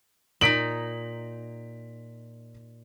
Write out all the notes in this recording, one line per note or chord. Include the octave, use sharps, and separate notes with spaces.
A#2 D#4 B6 D7 F#7